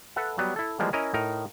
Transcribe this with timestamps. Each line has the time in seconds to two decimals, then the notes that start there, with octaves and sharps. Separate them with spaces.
0.16 A4 B4 E5 F#5
0.38 F#3 G3 B3
0.56 E4 A4
0.79 E3 F3 G3 G#3 A#3
0.93 C#4 E4 A#4 D#5
1.14 A2 D#4 A#4